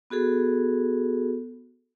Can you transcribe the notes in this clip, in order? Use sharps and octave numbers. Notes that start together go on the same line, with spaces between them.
B3 F#4 G#4 A4